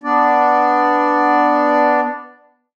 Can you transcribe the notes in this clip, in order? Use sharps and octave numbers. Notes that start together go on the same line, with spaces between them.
B3 D4 D5